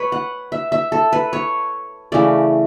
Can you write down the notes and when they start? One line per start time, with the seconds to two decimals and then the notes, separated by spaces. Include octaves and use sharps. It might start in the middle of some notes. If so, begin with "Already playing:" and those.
Already playing: B4 C#5
0.12 F#5
0.52 E5
0.72 E5
0.92 A4
1.13 B4
1.33 C#5
2.12 C#3 E3 A3 D5